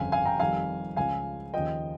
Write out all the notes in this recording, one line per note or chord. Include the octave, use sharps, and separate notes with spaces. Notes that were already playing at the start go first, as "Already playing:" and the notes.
Already playing: G1 F2 C#3 F5 G#5
F5 G#5
G5 A#5
F2 D#3 G3 F5 G#5
C#2 C#3 F3 F5 G#5
D#2 C#3 F3 D#5 G5